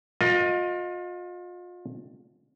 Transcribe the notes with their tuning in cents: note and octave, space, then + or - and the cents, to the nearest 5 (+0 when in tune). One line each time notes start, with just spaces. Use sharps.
F4 +35 A#4 +15 D#5 +0